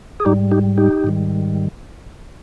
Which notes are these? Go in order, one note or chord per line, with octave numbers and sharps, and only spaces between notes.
G#4
G#2 G3 D#4 G4
D#4 G4
D#4 G4
G#2 D#3 G3